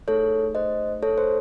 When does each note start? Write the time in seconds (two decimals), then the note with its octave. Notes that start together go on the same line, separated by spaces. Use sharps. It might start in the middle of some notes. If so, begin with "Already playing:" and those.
0.08 A3 D#4 G#4 A4 C#5
0.55 C5 D#5
1.03 A4 C#5
1.18 C5